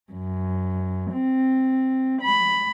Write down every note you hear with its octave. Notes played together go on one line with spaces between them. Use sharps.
F#2
C4
B5